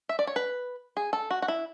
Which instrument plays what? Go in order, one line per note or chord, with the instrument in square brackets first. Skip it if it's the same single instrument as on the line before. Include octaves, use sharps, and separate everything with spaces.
[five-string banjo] E5
D5
C#5
B4
G#4
A4
F#4
F#4
E4